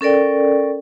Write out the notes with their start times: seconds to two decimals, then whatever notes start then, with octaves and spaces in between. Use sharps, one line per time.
0.01 C#4 A4 A#4 D5 G5